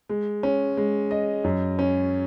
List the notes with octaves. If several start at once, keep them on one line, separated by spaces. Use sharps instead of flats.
G#3
C#4
G#3
D#5
F#2
C#4